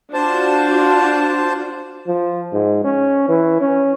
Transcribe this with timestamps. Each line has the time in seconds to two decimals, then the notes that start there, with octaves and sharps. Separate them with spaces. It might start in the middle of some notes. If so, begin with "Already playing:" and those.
0.14 D4 F4 F#4 C5 A5
2.07 F3
2.53 G#2
2.84 C#4
3.29 E3
3.61 C#4